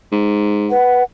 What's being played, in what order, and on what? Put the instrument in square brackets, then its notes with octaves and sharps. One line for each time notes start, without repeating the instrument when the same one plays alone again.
[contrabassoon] G#2
[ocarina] B4 [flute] F#5